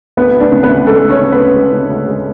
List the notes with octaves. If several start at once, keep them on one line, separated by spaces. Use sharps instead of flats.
D2 B3 B4
D2
D4
C#3
B3 B4
D2
G#3 A3 A4
D2
C#4 C#5
C#3
B3 B4
D2
G#3
C#3
D2
G#3